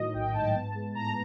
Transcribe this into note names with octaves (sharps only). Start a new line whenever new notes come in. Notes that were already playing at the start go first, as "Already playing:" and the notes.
Already playing: A2 D#3 F#3 D#5
A#1 G5
G#2 A5
B3
G#3
A2 A#5